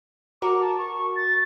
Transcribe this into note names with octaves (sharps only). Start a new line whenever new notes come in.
F#4 A#4 D6
A5
C#6
A6